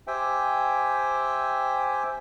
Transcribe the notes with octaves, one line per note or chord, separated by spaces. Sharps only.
G4 C5 E5 G5 G#5